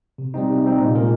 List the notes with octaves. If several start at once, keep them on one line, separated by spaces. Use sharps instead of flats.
C3
G3 C4 D#4
C3
G3 C4 D#4
A#2
G#3 C#4 F4 A#4